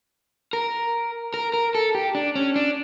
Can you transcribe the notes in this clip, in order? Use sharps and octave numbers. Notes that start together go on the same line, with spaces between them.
A#4
A#4
A#4
A4
G4
D4
C#4
D4